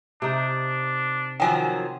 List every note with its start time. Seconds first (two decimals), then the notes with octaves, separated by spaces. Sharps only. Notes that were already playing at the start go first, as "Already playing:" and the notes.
0.22 C3 D4 D#4
1.40 D#3 F3 F#3 G5 G#5